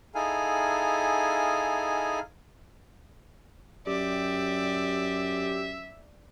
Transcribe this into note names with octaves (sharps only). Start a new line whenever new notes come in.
D#4 E4 G#4 A4 F5 G#5
F#2 G4 D5 E5